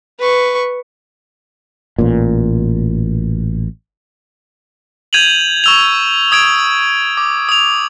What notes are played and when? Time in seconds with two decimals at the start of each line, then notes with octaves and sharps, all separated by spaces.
0.19 B4 C#6
1.98 A1 A#2
5.13 G6 G#6 D#7 F7 F#7
5.64 C#6 E6 F7
6.32 D#6 G#6 D7
7.17 D6
7.49 D#6 F7